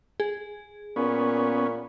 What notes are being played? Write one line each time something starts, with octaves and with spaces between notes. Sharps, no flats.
G#4
A#2 B3 C#4